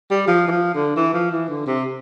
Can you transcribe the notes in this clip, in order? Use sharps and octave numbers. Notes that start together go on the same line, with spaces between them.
G3
F3
E3
F3
D3
E3
F3
E3
D3
C3